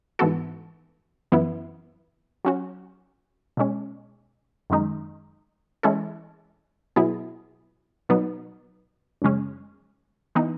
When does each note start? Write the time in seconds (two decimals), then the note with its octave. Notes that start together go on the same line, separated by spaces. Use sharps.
0.19 G#2 E3 B3 F#4 A4
1.32 F#2 E3 B3 E4
2.45 F#3 C#4 F#4
3.57 B2 G#3 C#4
4.70 F#2 D#3 G#3 D#4
5.83 E3 G#3 C#4 E4 A4
6.96 B2 F#3 B3 E4 G#4
8.09 B2 F#3 B3 D#4
9.22 F#2 C#3 G#3 C#4
10.35 E3 B3 D#4